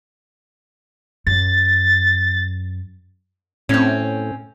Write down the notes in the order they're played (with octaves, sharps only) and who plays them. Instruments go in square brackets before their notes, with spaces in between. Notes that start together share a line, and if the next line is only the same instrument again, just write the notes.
[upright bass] F#2 [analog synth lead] A6
[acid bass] A2 [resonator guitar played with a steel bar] C4 C#4